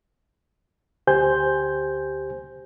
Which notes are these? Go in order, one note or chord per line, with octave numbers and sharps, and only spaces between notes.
D2 G4 C5 G#5 G6